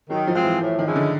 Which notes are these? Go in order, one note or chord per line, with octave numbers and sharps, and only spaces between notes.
D#3 F#3
F3
G#3 C4 F4
E3
A2
D#3
F3 G#3 C#4 E4
D3